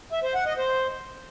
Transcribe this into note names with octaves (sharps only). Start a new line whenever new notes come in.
E5
C5
F#5
D#5
C5